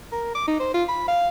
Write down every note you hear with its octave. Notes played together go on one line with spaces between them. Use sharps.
A#4
D6
D#4
C5
F4
B5
F5